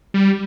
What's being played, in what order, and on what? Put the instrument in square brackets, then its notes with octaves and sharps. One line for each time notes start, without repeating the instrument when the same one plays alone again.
[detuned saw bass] G3